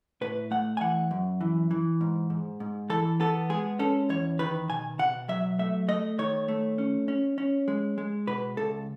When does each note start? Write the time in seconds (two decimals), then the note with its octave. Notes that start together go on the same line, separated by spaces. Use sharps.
0.21 A2 B4
0.51 A3 F#5
0.77 G#5
0.81 E3 F#5
1.11 F#2
1.41 E3
1.71 E3
2.01 G#2
2.30 G#2
2.60 G#2
2.90 E3 A4
3.20 B3 A4
3.50 G#3 G#4
3.79 C#4 A4
4.09 E2 C#5
4.39 D#3 B4
4.70 B2 G#5
4.99 B2 F#5
5.28 F#3 E5
5.59 A3 E5
5.88 A3 D#5
6.18 D#3 C#5
6.48 A3
6.78 C#4
7.08 C#4
7.38 C#4
7.68 G#3
7.98 G#3
8.27 B2 B4
8.57 C#2 A4